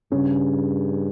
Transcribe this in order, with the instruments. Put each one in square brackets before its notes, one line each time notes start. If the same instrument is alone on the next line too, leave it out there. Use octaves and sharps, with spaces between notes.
[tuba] G2 [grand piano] C#3